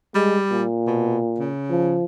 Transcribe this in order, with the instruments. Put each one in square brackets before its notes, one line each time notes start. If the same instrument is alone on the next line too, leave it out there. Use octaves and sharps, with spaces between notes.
[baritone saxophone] G3 [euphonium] G#3
[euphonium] A#2
[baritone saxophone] B2
C#3
[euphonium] F3